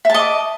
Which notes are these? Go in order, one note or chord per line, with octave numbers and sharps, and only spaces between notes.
D#5 E5 A5 D6